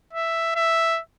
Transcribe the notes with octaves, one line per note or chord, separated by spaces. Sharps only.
E5
E5